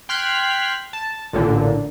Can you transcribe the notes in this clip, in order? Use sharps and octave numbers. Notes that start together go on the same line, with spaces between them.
G5 C6 F6 F#6 G#6 B6
A5
A1 A#2 D3